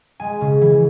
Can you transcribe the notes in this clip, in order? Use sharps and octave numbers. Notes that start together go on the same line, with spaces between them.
G#3 G#5
C#3
E3